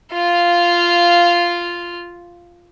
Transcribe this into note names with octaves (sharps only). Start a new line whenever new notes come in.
F4 F5